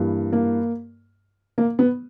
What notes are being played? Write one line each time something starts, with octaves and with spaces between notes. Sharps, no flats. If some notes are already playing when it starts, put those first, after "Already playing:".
Already playing: G2 E3 A#3
A#3
A#3
B3